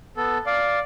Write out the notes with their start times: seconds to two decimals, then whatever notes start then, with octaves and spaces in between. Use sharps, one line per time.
0.17 B3 A4
0.46 D5 F5